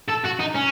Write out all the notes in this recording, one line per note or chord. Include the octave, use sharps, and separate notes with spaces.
A4
F#4
D#4
C#4